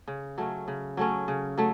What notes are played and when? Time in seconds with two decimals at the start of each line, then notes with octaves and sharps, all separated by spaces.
0.08 C#3
0.38 F#3 A3 C#4
0.68 C#3
0.97 F#3 A3 C#4
1.28 C#3
1.58 F#3 A3